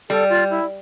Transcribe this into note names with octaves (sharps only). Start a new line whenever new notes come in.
G3 A4
F4
E4